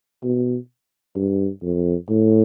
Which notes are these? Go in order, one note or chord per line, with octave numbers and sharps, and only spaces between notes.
B2
G2
F2
A2